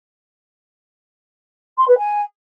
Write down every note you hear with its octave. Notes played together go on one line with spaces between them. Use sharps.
C6
B4
G#5